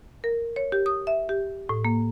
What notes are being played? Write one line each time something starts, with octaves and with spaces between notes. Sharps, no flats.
A#4
C#5
G4
D#6
E5
G4
A2
A#3